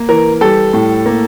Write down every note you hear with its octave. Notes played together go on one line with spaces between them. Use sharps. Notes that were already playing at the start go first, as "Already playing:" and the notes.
Already playing: A#3
E3 A#4
G3 A4
A2
A#3